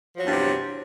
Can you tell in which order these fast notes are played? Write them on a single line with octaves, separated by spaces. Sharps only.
F3 F#3 E2 G2 C3